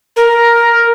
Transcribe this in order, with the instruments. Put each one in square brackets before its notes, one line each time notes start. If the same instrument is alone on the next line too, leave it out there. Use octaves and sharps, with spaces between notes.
[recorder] A#4